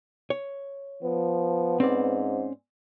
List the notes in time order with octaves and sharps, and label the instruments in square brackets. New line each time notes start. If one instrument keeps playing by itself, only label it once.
[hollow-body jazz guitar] C#5
[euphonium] F3 [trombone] B3
[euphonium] G#2 [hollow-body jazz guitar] C4 C#4 D5